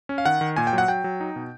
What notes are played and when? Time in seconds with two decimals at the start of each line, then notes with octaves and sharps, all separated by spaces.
0.09 C#4
0.18 F5
0.25 D#3 F#5
0.41 D#3
0.56 A#2 G#5
0.67 G5
0.73 F#3
0.78 F#5
0.88 F#3 G5
1.04 F#3
1.20 D#4
1.36 B2